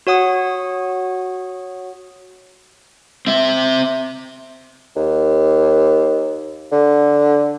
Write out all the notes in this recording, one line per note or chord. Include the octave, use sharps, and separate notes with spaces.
F#4 C#5 F#5 D#6
C4 E5
D#2
D3